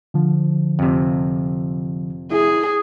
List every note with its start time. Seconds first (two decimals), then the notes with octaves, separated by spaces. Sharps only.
0.14 D3 F3
0.79 F2 C3
2.31 E4 G#4